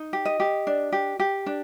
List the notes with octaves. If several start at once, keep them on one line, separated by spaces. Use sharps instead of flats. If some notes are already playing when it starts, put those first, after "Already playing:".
Already playing: D#4
G4
D#5
G4
D4
G4
G4
D4